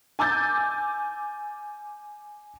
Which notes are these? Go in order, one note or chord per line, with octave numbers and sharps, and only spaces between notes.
G#5 D6 E6 G6 A6